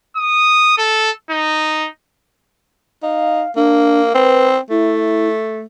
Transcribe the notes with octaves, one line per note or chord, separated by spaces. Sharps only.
D#6
A4
D#4
D#4 F5
A#3 D4
C4 B4
A3 E4